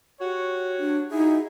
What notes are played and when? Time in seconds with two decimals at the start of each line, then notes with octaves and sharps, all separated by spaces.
0.21 F#4 G4 C#5
0.79 D4
1.11 D#4 E4 F#4 G#4